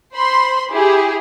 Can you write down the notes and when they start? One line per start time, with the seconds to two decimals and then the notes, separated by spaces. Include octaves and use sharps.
0.16 C5 B5 C6
0.71 E4 G4 G#4